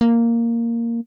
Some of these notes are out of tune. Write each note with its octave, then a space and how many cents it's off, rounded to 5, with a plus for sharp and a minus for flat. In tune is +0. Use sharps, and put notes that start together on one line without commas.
A#3 -5